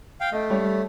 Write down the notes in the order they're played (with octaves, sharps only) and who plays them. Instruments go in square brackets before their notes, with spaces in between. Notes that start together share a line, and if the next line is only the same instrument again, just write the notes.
[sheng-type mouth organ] F5 G5
[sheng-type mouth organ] A3 [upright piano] D#5
[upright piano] G3 G4 C#5